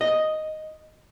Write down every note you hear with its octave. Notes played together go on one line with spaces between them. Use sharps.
D#5